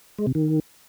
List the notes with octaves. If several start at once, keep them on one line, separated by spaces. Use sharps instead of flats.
G#3
C3
D#3